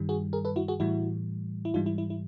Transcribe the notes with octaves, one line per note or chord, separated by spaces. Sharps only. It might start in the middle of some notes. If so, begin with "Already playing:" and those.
Already playing: G2 D#3 G3
F#4 G#4
G#4 A#4
A4 B4
E4 F#4
F#4 G#4
A2 E3 G3 E4 F#4
E4
G#2 E3 G3 D#4 F4
E4
E4
E4